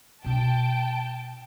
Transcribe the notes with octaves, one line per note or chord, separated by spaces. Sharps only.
B2 D4 G5 A5